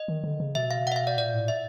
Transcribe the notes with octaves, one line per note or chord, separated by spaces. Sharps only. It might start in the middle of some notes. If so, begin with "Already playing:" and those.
Already playing: D#5
D#3
D3
C#3
B2 E5
F5
F#5
E5
F5
D5
A#2 D5
A2
E5